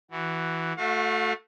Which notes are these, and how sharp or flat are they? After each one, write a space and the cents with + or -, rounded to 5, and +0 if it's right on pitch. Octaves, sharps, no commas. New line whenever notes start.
E3 -5 F#4 +5
A3 +0 F#4 -30 F5 +40